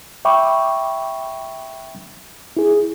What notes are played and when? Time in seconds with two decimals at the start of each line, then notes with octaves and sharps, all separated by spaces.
0.25 E5 G5 B5 C#6 D6
2.57 E4 G#4